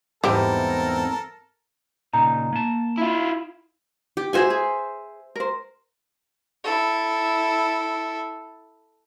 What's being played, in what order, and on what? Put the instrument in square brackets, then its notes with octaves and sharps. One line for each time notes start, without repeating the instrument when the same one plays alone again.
[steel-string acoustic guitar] E2 G#2 C4 [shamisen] G3 E4 G4 [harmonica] A4 A#4
[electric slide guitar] A#2 C#3 D#4 [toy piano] A#5
[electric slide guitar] A#3 A5
[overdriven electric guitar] E4 F4
[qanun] G4
[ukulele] F4 F#4 G#4 [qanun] C5 E5 G#5
[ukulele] G#4
A#4 C5
[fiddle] E4 A4